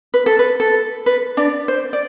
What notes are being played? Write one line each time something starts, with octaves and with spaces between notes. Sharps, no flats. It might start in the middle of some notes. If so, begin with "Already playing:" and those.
B4
A4
B4
A4
B4
D4 D5
C5
D5